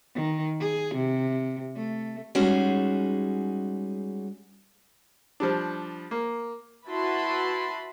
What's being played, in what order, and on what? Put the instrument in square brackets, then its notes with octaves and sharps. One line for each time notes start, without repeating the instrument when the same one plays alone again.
[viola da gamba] D#3
G#4
C3
A3
[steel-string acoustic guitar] G3 G#3 C#4 D#4 F#4 G#4
[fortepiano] F3 G3 D4
A#3
[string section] E4 F#4 B4 A5 B5 C6